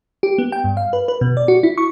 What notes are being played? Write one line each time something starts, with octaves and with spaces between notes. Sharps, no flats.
G4
B3
G5
G2
F5
B4
B4
B2
D5
F#4
E4
C#6